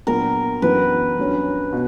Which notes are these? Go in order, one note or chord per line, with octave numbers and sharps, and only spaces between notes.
A#2 F#3 B3 D4 F#4 A#4
F#2 E3 B3 D4 B4
G2 F#3 C#4
B2